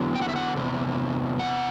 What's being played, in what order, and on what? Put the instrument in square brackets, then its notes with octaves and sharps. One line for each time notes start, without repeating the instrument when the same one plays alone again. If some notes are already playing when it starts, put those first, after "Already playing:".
Already playing: [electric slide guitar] E2 D3 F#3
G5
F#5
E5
F#5
E2 C3
F#5